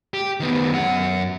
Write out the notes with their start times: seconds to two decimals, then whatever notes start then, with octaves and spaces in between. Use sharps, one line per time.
0.14 G4
0.40 D#3 B3
0.72 F#2 F#5